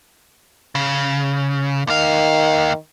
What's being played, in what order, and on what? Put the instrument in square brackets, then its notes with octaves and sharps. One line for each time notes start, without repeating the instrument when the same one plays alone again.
[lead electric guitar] C#3
[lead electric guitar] D#2 F5 [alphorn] D#3